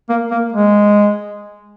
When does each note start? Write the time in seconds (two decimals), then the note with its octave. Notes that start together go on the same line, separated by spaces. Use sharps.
0.09 A#3
0.31 A#3
0.53 G#3